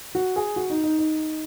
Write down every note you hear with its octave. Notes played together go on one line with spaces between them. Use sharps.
F#4
G#4
F#4
D#4
D#4
D#4